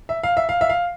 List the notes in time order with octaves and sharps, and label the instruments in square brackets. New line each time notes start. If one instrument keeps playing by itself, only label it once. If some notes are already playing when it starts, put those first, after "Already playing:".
[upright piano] E5
F5
E5
F5
E5
F5